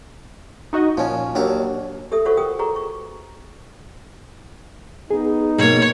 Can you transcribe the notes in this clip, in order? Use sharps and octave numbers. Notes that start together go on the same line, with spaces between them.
D#4 F#4 D#5
A#2 F3 C#4
D#2 F#3 D4 A#4
G4 A4 E5 D#6
F4 F#4 A4 C5 F#5 C#6
G4 A#4 G5 D#6
F#4 G#4 B4 A#5 C#6
C#6
B3 D#4 G#4
B2 A#3 C#5